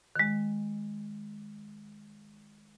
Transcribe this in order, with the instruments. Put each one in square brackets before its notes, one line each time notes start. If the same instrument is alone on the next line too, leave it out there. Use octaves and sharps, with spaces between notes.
[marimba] D#3 G#3